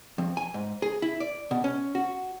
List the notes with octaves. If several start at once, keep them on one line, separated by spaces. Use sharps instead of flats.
F2
G#5
G#2
G#4
E4
D5
B2
C#4
F#4